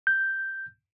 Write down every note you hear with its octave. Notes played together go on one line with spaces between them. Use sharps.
G6